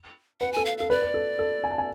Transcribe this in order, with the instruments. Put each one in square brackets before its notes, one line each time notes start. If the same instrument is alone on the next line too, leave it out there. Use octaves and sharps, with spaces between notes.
[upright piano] B4 [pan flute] F#5
[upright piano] A4 [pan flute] G#5
[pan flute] F5
[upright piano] A4 [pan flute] F5
[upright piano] B4 [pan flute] D5
[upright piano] B4
A4
A4
G#5
A5
G#5